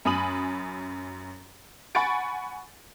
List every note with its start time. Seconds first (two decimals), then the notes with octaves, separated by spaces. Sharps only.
0.05 F#2 G#5 B5 D#6 D#7 F#7
1.95 F#5 G#5 B5 C#6 A6 D7